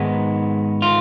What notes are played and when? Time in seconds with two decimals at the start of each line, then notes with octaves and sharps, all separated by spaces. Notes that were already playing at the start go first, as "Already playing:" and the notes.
Already playing: G#2 D#3 G#3 B3
0.82 F4